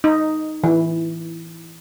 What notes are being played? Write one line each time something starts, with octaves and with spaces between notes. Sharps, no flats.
D#4
E3